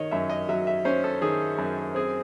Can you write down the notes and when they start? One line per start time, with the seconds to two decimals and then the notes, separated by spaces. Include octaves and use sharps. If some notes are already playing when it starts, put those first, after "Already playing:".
Already playing: D#3 C#5 D#5
0.11 F#2 E5
0.30 D#5
0.49 F#3 E5
0.67 E5
0.85 C#4 C5
1.04 A4
1.22 D#3 G#4
1.58 F#2
1.95 C4 G#4